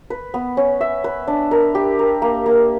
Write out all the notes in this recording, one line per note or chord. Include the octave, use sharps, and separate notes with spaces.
B4
B3
C#4
E5
B4
D4
A#4
G4
A#4
A#3
A#3